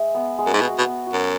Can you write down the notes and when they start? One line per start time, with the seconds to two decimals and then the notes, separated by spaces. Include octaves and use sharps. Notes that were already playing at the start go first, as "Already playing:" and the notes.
Already playing: G#3 E5
0.15 B3
0.39 G#3
0.46 F#2
0.53 G#2
0.61 B2 F#4
0.78 B2
0.84 B3
1.07 F#4
1.13 F#2